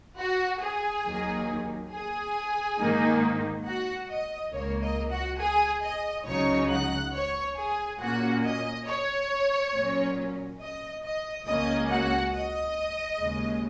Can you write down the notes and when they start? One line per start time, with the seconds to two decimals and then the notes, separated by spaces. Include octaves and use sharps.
0.19 F#4 F#5
0.61 G#4 G#5
1.05 D#2 D#3 F#3 A#3 D#4
1.92 G#4 G#5
2.79 G#2 D#3 A#3 D#4
3.66 F#4 F#5
4.09 D#5
4.53 C#2 C#3 A#3 C#5
4.82 D#5
5.10 F#4 F#5
5.39 G#4 G#5
5.82 D#5
6.26 C#2 C#3 F#3 D#4 C#5 C#6
6.70 F#5 F#6
7.13 C#5 C#6
7.57 G#4 G#5
8.00 A#2 A#3 C#4 F#4 F#5
8.44 D#5
8.87 C#5
9.74 A#2 F#3 C#4
10.60 D#5
11.03 D#5
11.48 C#2 C#3 A#3 C#4 D#5
11.90 F#4 F#5
12.34 D#5
13.20 D#2 C#3 G#3